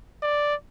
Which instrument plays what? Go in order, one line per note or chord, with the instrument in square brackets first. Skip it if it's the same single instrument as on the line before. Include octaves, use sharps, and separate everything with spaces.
[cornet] D5